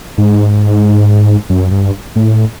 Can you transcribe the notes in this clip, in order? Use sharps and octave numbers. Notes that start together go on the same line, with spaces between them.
G#2
F#2
G2
A2